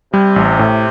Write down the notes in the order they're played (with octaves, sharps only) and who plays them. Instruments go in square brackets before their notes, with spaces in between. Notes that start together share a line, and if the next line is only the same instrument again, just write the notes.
[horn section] C3 [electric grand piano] G3
[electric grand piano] A1
A2